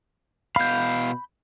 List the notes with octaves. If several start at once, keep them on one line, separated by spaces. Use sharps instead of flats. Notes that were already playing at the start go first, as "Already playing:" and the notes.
B2 F5 B5 G6